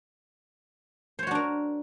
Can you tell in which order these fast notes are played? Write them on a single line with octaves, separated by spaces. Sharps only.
C5 C#5 F#4 D4 A#4